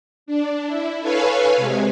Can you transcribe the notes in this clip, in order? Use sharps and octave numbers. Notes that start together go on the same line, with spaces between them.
D4
E4
A4 B4 C#5 F5 G#5
C3 G#3